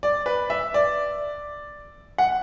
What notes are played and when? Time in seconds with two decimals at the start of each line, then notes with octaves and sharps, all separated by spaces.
0.03 D5
0.26 B4
0.50 E5
0.74 D5
2.18 F#5